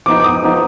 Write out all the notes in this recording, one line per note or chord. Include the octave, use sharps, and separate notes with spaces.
F3 B3 D#4 D6
D6
D#6
F3 B3 D#4